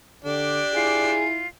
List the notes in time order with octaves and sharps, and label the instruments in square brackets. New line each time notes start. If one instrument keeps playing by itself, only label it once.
[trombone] D3 [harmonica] D4 G4
[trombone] E4 [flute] F4 [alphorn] G#4